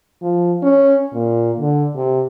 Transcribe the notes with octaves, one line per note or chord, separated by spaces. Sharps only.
F3
C#4
A#2
D3
C3